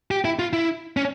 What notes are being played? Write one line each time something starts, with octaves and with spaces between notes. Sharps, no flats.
G4
E4
F4
E4
C#4